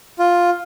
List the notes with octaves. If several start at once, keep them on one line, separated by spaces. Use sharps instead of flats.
F4